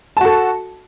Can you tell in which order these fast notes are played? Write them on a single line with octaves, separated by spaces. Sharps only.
A5 F#4 A4